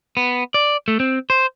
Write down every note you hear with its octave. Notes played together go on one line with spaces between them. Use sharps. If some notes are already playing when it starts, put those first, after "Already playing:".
B3
D5
A3
C4
C5